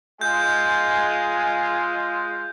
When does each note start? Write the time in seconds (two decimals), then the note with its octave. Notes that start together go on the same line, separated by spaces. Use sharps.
0.21 G#3 F4 G#5 G6